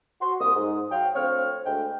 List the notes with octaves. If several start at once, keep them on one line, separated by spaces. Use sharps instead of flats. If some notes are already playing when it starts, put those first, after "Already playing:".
F#4 C6
C2 A#3 D#6
G#2
F#3 F5 G5
D2 C4 C#5 F5 F6
D2 G#3 G5